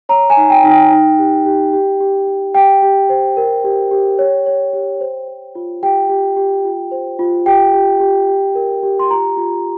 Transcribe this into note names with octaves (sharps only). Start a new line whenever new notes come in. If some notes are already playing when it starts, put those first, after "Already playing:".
C#5 A#5
G#5
D#4
G5
D#4
G5
D#4
G4
G4
G4
G4
G4
G4 G5
G4
C5
A#4
G4
G4
C#5
C#5
G4
C5
C5
F4
G4 G5
G4
G4
F4
C5
F4
G4 G5
G4
G4
G4
A#4
G4
C6
F4 A#5
F4